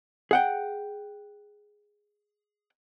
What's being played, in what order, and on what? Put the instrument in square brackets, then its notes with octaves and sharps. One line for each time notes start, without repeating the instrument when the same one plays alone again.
[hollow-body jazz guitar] G#4 F#5 G5